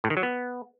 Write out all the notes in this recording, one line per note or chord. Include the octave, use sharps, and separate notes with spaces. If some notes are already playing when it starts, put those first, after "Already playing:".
A2
D#3
F#3
B3